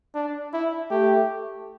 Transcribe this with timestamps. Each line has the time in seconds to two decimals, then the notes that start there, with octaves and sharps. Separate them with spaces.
0.15 D4
0.53 E4
0.91 A3 G4